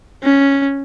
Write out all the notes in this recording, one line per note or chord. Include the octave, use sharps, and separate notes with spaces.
C#4